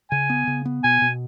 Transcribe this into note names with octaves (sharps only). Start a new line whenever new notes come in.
C#3 G#5
B3
C#3
B3
B2 G#5
B2